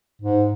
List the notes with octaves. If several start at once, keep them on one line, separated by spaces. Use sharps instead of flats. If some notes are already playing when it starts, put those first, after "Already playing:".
G#2